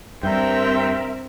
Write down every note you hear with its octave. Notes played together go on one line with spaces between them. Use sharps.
G2 C4 A#4 E5 G5